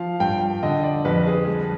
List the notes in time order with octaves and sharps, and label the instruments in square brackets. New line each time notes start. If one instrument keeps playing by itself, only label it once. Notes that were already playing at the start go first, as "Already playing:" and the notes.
Already playing: [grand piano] F3 F5
G2 G5
D3 D#5
D5
F2 B4
G#4
G3